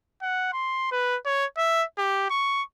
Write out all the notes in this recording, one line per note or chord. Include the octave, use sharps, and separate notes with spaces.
F#5
C6
B4
C#5
E5
G4
C#6